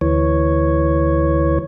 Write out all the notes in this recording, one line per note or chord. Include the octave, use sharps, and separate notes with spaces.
D2 E3 C#5